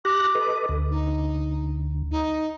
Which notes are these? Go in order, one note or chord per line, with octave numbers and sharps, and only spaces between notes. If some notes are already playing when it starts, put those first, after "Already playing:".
G4 D6 F#6 A#6
A4 B4 D#5
D2
D#4
D#4